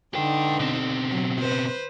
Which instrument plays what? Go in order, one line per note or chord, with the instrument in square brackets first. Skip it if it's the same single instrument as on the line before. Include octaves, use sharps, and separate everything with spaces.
[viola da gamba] D3 D#4 [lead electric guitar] B4 G5
[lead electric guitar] B2 C4
[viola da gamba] F#3
B4 C5